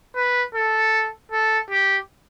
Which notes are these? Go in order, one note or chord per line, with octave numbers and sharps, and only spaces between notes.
B4
A4
A4
G4